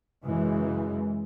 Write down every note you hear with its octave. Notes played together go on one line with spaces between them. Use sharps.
F#2 C#3 E3 G#3